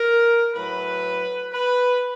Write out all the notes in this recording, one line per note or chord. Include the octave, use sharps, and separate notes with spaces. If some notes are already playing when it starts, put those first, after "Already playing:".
Already playing: A#4
A2 F#3 B4
B4